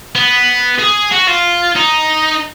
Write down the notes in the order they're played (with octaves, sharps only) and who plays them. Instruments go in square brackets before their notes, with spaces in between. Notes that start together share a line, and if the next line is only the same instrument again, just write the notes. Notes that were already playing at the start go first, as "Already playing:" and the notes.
[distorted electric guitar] B3
G#4
F#4
F4
D#4